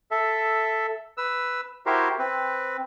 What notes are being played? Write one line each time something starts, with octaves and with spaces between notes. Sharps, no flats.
A4 E5
B4 E6
E4 F#4 G4 A#4 C5
C4 B4